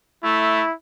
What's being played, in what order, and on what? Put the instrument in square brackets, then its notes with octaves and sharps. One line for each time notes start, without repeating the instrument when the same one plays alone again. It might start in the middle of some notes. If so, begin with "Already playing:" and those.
[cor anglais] A3 [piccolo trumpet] E4